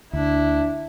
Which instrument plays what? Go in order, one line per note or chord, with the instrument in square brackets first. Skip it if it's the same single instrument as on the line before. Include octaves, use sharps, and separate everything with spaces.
[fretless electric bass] D2 [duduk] D4 [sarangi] E4